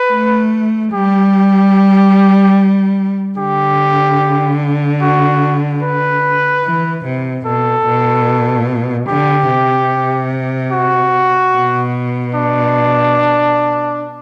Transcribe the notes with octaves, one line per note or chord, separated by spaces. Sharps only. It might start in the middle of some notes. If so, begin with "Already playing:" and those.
Already playing: B4
A3
G3 G4
D3 G4
F#4
B4
E3
C3
B2 A4
B2
D3 G4
C3
F#4
B2
D4